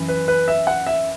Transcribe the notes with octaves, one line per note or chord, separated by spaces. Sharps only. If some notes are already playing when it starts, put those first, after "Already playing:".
Already playing: F#2 E3
B4
B4
E5
F#5
E5